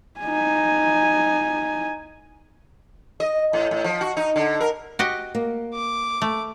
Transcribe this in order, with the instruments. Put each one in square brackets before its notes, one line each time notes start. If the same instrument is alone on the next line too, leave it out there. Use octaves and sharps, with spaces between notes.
[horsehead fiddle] D#4 G#5
[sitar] D#5
A2
A2
F3
F#4
D#4
D3
A#4
[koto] F#4 G4 D#5
[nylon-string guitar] A#3
[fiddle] D6
[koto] A3